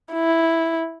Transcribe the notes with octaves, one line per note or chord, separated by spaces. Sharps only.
E4